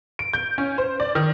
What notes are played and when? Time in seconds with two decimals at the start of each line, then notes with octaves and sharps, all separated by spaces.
0.19 D7
0.33 G6
0.58 C#4
0.78 C5
1.00 D5
1.15 D#3